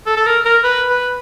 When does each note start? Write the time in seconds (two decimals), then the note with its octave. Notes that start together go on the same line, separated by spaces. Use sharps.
0.06 A4
0.17 A4
0.26 A#4
0.45 A#4
0.64 B4
0.89 B4